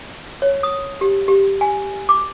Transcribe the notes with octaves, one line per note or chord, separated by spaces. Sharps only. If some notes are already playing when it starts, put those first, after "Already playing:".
C#5
D#6
G4
G4
G#5
D6